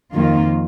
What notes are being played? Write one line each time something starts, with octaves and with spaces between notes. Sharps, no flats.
F2 D#3 A#3 F4